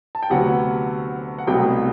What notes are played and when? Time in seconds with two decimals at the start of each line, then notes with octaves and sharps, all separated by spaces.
0.15 A5
0.23 G5
0.30 D2 C3 F#3 B3 F#5
1.38 F#5
1.47 C2 B2 F#3 A3 G5